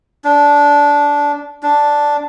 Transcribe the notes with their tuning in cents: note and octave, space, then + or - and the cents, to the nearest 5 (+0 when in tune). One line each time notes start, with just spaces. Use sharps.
D4 -15
D4 -5